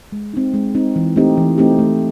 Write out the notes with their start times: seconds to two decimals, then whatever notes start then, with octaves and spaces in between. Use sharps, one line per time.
0.12 G#3
0.33 C4 D#4
0.54 G#3
0.75 C4 D#4
0.96 E3
1.16 A3 C4 D#4 G4
1.37 E3
1.58 A3 C4 D#4 G4
1.79 A3